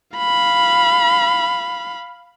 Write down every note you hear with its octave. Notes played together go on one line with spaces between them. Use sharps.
F5 B5